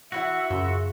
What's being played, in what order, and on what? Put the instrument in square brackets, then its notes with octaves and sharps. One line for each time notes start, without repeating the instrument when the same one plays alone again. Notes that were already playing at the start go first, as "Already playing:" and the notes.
[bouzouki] E3 E4 F#5 [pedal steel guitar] F#4 [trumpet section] E5
[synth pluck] F#2 [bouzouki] C#3 F4